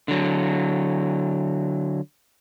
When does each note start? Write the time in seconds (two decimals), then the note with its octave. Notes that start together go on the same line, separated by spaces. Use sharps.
0.08 D3 F#3